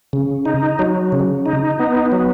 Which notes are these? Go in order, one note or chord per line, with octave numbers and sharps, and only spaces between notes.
C#3
D#4
F#3
C#3
D#4
B3
F#3